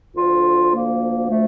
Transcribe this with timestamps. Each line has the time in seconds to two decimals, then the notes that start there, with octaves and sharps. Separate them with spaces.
0.15 D2 D3 F3 F4
0.73 A#3
1.30 A3